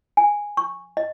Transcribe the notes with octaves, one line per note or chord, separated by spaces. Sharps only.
G#5
C#6
D#5